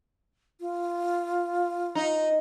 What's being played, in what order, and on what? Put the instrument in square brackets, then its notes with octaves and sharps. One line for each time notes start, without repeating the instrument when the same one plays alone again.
[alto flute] F4
[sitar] D#4